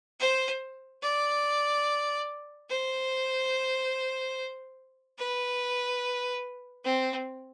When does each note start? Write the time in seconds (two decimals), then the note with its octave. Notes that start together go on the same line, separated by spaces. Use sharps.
0.20 C5
1.02 D5
2.69 C5
5.18 B4
6.84 C4